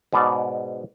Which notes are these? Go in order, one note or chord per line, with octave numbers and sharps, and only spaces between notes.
G#2 B2 D5